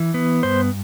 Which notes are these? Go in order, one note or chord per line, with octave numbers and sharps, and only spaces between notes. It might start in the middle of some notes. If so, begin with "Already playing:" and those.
Already playing: E3
B3
G2 C5